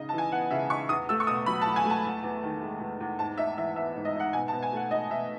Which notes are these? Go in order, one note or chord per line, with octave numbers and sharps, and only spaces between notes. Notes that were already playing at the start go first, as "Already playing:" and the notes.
Already playing: C#3 D#4 D#5
A5
E3
G#5
B3 F#5
C#3 E5
D#4 C#6
E2 D#6
A3 E6
C#6
B2 D#6
F#3 B5
A5
E2
G#5
A3
A5
E2
E2
D#3
G#3
E2
E2
G#2 A5
D#4 E5
E3 E5
B3 E5
G#2
D#5
D#4 F#5
B2 G#5
A5
B2
G#5
A3 F#5
D#4 D#5
B2 E5